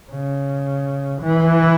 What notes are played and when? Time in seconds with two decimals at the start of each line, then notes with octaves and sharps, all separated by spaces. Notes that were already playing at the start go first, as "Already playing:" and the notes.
0.11 C#3
1.22 E3